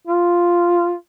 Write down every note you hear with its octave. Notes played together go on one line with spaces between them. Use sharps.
F4